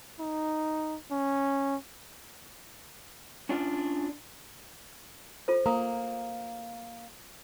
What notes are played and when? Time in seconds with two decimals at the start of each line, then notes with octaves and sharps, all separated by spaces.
0.20 D#4
1.11 C#4
3.49 C#4 D4 F4 D5
5.48 F4 A4 C5
5.66 A#3 A#5 D#6